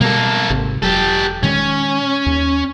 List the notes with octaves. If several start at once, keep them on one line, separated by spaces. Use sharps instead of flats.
B2 G3 A#3 A4
G#1 C3
E1 F#3 G4 A4
A#2 D#3 G#3 C#4
D#2